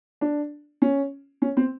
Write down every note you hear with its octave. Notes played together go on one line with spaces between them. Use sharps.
D4
C#4
C#4
C4